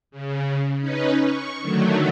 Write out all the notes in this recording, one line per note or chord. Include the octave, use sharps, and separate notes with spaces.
C#3
C#4 D#4 B4
C#6
D3 D#3 F#3 A3